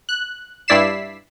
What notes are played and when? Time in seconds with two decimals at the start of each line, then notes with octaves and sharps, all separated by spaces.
0.09 F#6
0.68 G2 E4 D5 B6 C7 E7